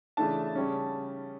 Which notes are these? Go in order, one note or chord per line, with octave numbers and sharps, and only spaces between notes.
C#3 E3 A3 D4 A5
C#3 G3 C#4